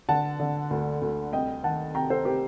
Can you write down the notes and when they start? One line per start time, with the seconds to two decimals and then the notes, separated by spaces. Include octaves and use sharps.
0.09 D3 F#5 A5
0.40 D3
0.70 D2
1.02 D2
1.33 C2 D#5 G5
1.63 D#3 F#5 A5
1.95 C3 G5 A#5
2.10 A4 C5
2.25 C3 G4 A#4